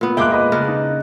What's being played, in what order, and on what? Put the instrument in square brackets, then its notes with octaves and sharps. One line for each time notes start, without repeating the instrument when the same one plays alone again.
[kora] A#2 B3
[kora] G#3 A#3 G5 [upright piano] E5 D6 F#6
[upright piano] B4 D#5
[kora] C#3 D4 A#4
[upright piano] D#4